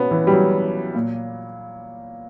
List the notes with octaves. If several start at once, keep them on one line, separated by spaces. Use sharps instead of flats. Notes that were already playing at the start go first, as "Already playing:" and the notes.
Already playing: B2 B3 C#4
E3
G3
F#3
A#2